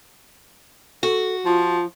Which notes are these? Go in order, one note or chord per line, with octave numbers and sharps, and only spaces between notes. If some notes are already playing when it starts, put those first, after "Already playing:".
F#4 A4
F3 F4